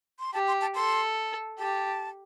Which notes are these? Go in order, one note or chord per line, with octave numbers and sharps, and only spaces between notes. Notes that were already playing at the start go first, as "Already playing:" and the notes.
C6
G4 A5
C6
A5
A4 C6
G4 A5